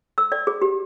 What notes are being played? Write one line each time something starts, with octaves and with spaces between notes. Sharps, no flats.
E6
D5
G#4
G4